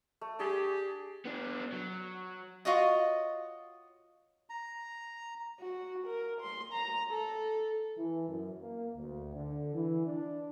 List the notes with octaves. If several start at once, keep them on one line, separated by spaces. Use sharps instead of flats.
A3
D4 G4 G#4
B3 D4
F#3
F4 F#4 C#5 D#5
A#5
F#4
A#4
C6
A#5
A4
E3
F#2
A#3
D2
D3
E3
D4